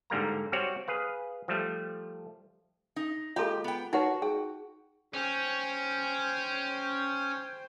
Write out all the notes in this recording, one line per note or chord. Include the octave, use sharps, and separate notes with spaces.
G#2 D3 G3 A#3 A#5
G3 C4 F#4 C#5 D5
G#4 B4 F5
F3 G3 A3
D#4
G#3 A#3 F4 G4 A4 A#4
B3 G5
D#4 F#4 A#4 B4 C#5 F#5
G#4 G5
C#4 C5 G5